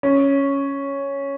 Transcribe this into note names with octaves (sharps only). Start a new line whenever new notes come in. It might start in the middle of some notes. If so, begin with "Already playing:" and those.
C#4